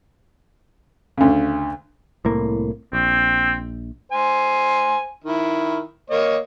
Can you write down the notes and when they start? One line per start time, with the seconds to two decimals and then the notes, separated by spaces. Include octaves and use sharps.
1.18 D2 C#3
2.25 C2 A2 A#3
2.93 A#1 C4
4.12 C5 G#5
5.24 D#3 E4
6.10 A#3 C#5 D#5